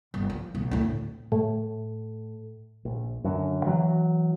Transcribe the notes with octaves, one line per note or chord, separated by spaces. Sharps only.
G1
F3
B1
D2 A2
A2
A#1
F#2 D3
E3 F#3